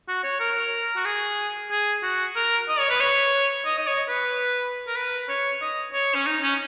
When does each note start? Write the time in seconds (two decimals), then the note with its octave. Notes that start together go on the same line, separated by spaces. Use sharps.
0.09 F#4
0.24 C#5
0.40 A#4
0.96 F#4
1.05 G#4
1.71 G#4
2.03 F#4
2.36 A#4
2.69 D#5
2.79 C#5
2.90 B4
3.01 C#5
3.66 D#5
3.78 D#5
3.87 C#5
4.09 B4
4.87 A#4
4.96 B4
5.29 C#5
5.61 D#5
5.94 C#5
6.15 C#4
6.27 D#4
6.43 C#4